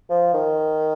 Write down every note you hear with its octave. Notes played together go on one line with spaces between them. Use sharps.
F3
D#3